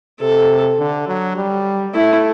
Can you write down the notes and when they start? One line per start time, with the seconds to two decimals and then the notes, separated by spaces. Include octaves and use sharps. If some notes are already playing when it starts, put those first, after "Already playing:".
0.20 C3 A4
0.79 D3
1.08 F#3
1.37 G3
1.94 A3 E4